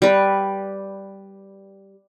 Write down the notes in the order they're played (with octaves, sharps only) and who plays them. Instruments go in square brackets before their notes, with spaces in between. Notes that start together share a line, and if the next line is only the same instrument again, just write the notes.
[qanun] G3 B4